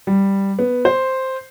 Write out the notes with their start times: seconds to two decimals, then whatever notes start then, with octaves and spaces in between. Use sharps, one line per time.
0.07 G3
0.59 B3
0.85 C5